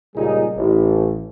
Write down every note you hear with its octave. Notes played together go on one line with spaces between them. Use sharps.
C#2 A#2 G3 D#4 G#4
A1